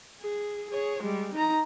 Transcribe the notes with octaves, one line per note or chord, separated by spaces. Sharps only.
G#4
G#4 C#5
G3 G#3
D#4 A#5